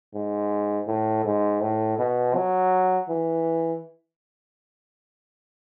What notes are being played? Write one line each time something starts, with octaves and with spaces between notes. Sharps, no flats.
G#2
A2
G#2
A2
B2
F#3
E3